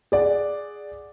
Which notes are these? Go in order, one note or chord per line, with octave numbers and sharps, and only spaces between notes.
G#4 D5 F#5